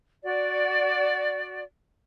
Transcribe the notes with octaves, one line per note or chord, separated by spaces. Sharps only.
F#4 D5